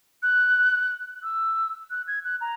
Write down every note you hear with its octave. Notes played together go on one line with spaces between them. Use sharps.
F#6
E6
F#6
G#6
F#6
A#5